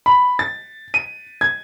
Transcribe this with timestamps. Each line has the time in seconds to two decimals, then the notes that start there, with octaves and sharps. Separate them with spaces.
0.06 B5
0.39 A6
0.94 D#7
1.41 G#6